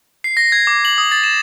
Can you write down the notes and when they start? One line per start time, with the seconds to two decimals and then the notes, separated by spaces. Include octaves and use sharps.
0.24 C7
0.37 A#6
0.52 G#6
0.67 D6
0.85 F#7
0.98 D#6
1.12 A6
1.24 E7